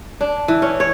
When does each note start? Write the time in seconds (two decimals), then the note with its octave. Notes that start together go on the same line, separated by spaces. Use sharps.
0.21 D4
0.48 E3
0.62 C#4
0.80 C#5